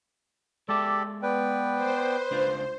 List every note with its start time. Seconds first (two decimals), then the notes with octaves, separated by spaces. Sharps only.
0.69 G#3 G4 A4 D5 E5
1.23 B3 B4 D5 G5
1.75 C5
2.31 C#2 D4 F4